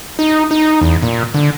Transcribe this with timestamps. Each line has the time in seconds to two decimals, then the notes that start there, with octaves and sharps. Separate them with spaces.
0.19 D#4
0.51 D#4
0.81 E2
1.02 A#2
1.34 D3